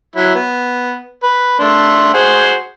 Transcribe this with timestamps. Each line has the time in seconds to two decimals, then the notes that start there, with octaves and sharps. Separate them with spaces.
0.15 F#3 E4
0.34 B3
1.23 B4
1.59 A3 D4 C6
2.14 F#4 G#4 C5